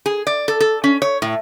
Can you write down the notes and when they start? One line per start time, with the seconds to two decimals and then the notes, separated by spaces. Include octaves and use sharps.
0.06 G#4
0.27 D5
0.48 A4
0.60 A4
0.84 C#4
1.02 C#5
1.22 A2